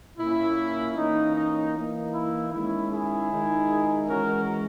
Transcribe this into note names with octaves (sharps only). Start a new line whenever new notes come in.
A#2 A#3 C#4 E4
E3 A#3 C#4 D#4
D#4
E3 A#3 D#4
E4
D#3 G#3 C#4 E4
E4 G#4
D#3 G#3 D#4
E3 G#3 C#4 F#4 A#4